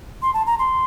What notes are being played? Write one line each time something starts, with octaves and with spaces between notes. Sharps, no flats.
C6
A5
A#5
C6